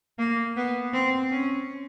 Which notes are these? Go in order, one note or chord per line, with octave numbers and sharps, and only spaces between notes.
A#3
B3
C4
C#4